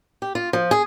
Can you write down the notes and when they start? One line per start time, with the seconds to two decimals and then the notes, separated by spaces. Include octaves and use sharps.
0.22 G4
0.35 F4
0.53 F3
0.71 G#4